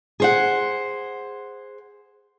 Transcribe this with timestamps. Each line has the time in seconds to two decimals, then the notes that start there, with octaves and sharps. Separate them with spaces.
0.20 G#4 C5 F#5